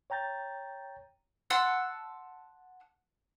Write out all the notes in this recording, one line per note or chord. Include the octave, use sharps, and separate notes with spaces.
C#5 G5 A#5 G6 A6
F#5 A5 C6 E6